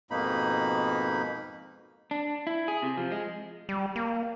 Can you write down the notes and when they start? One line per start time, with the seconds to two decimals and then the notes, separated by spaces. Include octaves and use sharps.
0.11 F2 G#2 B2 A#3 D#4 B5
2.11 D4
2.47 E4
2.68 G#4
2.82 C3
2.97 F3
3.12 G#3
3.69 G3
3.96 A#3